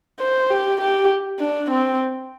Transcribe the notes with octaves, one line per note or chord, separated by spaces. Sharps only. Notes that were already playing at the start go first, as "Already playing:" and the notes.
C5
G4
G4
D4
C4